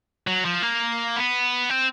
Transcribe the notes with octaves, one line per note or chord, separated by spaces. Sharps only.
F#3
F3
A#3
B3
C4